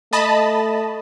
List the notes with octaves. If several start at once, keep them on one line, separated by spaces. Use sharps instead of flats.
A3 D#5 A5 B5